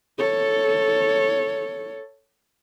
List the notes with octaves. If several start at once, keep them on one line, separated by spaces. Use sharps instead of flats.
A4 C#5